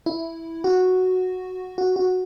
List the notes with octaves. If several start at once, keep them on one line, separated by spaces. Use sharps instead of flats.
E4
F#4
F#4
F#4